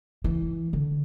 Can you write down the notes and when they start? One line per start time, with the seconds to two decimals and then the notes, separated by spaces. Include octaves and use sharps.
0.24 E3
0.73 D3